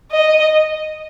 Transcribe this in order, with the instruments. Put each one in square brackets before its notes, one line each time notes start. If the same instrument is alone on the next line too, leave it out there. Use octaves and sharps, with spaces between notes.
[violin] D#5